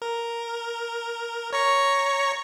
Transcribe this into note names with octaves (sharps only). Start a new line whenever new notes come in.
A#4
C#5 A#5 C#6